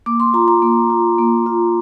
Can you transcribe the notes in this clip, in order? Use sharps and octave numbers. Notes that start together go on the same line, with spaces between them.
A#3 D6
C6
F4 A#5
A#5
A#3
F4
A#3
F4